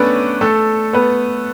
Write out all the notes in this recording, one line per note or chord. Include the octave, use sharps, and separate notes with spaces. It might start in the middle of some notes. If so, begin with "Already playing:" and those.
Already playing: A3 B3 C#4 D4 A4 B4 C#5 D5
A3 A4
B3 B4